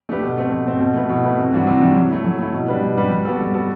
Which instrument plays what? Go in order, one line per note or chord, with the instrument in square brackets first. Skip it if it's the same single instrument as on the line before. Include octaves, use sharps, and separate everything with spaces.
[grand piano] A3 D4 G4 B4
B2
A3 C4
B2
A3 C4
B2
A3 E4 B4
B2
A3 E4 B4
C3
E3 G3 D4 F#4
C3
E3 G3 D4 F#4
F#3
A3 E4
F#3
A3 E4
B2
G3 D4 G4 B4
B2
G3 D4 G4 B4
G3
B3 F#4 A4
G3
B3 F#4 A4